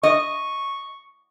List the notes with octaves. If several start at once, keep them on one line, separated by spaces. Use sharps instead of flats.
D#5 C#6